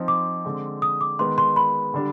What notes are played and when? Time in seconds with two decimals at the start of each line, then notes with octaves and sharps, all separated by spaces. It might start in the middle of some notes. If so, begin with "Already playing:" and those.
Already playing: F3 C4 D#4
0.08 D6
0.45 D3 G#3 C4
0.82 D#6
1.01 D6
1.19 D#3 G#3 B3 C6
1.38 C6
1.56 B5
1.94 D3 G3 D4